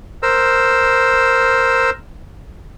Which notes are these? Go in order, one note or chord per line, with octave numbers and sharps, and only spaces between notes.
A#4 C5 E6